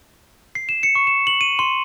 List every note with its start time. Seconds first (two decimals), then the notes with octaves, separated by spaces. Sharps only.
0.55 C7
0.69 E7
0.83 C#7
0.95 C#6
1.07 E7
1.27 F#7
1.41 D#7
1.59 C6